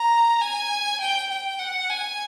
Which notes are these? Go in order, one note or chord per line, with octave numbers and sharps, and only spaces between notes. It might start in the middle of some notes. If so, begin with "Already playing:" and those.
Already playing: A#5
G#5
G5
G5
F#5
G#5